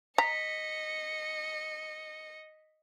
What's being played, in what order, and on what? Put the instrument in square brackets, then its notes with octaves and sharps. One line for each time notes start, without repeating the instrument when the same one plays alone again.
[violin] D#5 C#7 [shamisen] A#5 [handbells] B6